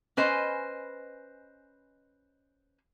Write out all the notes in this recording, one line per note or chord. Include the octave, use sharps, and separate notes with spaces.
C#4 B4 C5 D#5 G#5